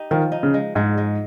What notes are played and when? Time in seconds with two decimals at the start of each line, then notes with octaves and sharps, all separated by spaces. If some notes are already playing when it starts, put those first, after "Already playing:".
Already playing: D#4 G4
0.11 D#3 F3
0.32 D#4
0.43 C#3
0.54 G#3
0.75 G#2 G#3
0.98 G#3